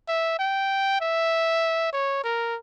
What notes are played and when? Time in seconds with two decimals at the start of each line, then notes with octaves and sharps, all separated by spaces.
0.08 E5
0.39 G5
1.01 E5
1.93 C#5
2.24 A#4